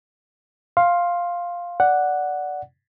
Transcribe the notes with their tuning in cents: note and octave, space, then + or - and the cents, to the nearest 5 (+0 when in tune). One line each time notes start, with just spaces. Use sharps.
F5 +0 C6 +15
D5 -5 F#5 +0